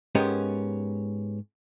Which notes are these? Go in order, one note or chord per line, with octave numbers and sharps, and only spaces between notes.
G#2 G#3 B3 C#4 G4 A#4